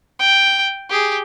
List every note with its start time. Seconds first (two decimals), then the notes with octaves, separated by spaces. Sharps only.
0.20 G5
0.89 G4 G#4